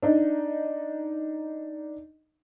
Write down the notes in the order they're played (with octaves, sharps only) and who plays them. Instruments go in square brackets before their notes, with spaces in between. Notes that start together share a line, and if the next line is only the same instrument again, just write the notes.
[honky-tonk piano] D4 D#4